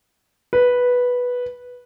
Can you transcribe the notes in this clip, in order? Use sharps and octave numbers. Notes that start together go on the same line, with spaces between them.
B4